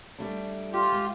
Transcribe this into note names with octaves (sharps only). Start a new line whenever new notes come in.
G3 A3 D4
F4 G4
G#3